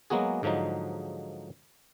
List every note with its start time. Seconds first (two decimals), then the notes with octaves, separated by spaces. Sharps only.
0.10 F#3 G#3 A#3 B3 F#4 G#4
0.43 G#2 D3 F3 F#3 D#4